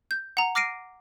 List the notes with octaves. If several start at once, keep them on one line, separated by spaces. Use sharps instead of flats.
G6
F#5 A#5
D6 F6 A#6 C7 D7 D#7